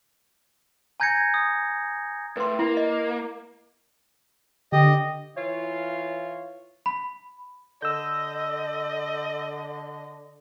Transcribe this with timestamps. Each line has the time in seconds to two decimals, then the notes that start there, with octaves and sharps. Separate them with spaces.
1.00 G#5 A#5 G6 G#6 A#6 C#7
1.34 D#6
2.37 A2 B4 C6
2.59 A#3 E4
2.77 D#5
4.72 D3 G4 D#5
5.37 E3 E4 F4 C#5 F5
6.86 B5
7.82 D3 D#5 E6 G6